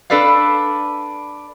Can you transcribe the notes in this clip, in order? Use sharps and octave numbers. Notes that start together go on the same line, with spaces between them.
D4 A4 B4 D5 F5